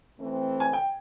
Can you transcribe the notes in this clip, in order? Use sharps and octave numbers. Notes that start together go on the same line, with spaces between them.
E3 A3 C4
G#5
G5